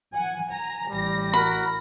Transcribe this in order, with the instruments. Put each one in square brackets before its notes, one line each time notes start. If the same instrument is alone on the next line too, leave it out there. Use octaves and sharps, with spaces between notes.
[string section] F#5 G#5
G#5 A#5
[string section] A1 A#6 [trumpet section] G3
[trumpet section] F#4 A#4 [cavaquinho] B5